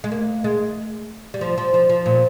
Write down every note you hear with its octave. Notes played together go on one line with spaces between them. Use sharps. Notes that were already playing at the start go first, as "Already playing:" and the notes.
G#3
A#3
G#3
G3
F3
F3
F3
F3
A#2